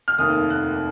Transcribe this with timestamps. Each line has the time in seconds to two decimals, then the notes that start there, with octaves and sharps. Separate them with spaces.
0.08 F6
0.18 F1 D#2 D#3 A#3 D#6
0.50 F#6